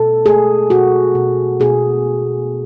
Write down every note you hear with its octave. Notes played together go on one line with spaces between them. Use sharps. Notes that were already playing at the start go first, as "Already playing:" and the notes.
Already playing: B2 A4
A3 G#4
B2 F#4
B2
B2 G#4